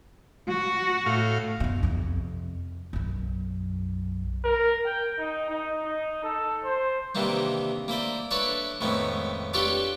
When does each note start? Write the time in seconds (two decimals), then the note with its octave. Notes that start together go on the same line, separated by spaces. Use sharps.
0.48 F#4
1.06 A2 F5
1.60 F#1 B2
1.83 F2 C3
2.93 B1 F#2
4.44 A#4
4.86 G5
5.19 D#4
5.50 D#4
5.83 D#4
6.24 A4
6.64 C5
7.15 C3 D#3 E3 A#3 D4
7.88 A#3 E4 C5 D5
8.31 D4 E4 A4 B4 C#5 D5
8.81 F2 A2 D#3 G#3 B3 C#4
9.54 D4 F4 G4 A4 B4 C#5